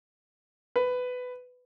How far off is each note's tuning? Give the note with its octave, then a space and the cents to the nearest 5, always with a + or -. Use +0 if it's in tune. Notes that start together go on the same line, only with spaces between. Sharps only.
B4 +15